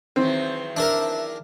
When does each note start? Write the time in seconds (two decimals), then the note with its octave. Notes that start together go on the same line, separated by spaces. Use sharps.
0.16 E2 D#3 F#3 C4
0.77 D4 A#4 E5